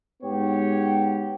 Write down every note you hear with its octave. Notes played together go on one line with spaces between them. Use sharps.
G#2 B3 G4 C#5